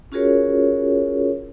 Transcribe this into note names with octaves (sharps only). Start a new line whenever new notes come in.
C#4 F4 F#4 G#4 A#4 C#5